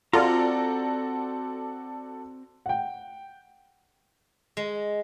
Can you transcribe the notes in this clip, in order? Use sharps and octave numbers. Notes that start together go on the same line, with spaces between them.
C4 F4 F#4 A4 D5 A#5
F#5 G5
G#3